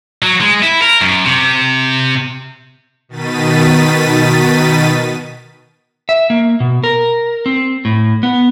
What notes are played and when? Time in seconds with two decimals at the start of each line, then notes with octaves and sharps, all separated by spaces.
0.22 F#3
0.41 G#3
0.63 E4
0.82 A#4
1.02 F#2
1.26 C3
3.09 B2 D#3 A6 B6 D#7
6.09 E5
6.30 A#3
6.60 B2
6.84 A#4
7.46 C4
7.85 A2
8.23 B3